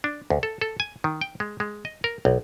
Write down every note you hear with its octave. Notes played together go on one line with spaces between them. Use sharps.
D4
D2
A4
A4
G#5
D#3
G5
G#3
G#3
D#5
A#4
B1